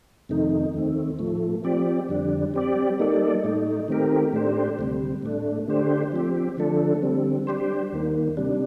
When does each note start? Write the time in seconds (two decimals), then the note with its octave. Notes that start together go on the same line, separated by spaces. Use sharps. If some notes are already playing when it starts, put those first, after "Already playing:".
0.29 F2 C3 D#3 A3 D#4
0.74 D#2 D#3 A3 C4
1.19 A2 F3 A3
1.64 F3 C4 G4 D5
2.09 F2 D3 G3 D4
2.54 G3 C4 G4 D5
2.99 G3 A#3 D#4 A4 D5
3.44 A2 A3 D#4
3.88 D#3 A3 C4 G4 A#4
4.33 A2 A3 D4 G4 C5
4.79 D2 C3 G3
5.23 A2 A3 D4
5.68 D3 A3 D4 G4 C5
6.12 F3 C4 G4
6.57 D3 F3 A3 D4 A4
7.02 D3 G3 C4
7.47 G3 D4 G4 C5
7.92 D#2 D#3 A#3
8.37 C3 G3 D4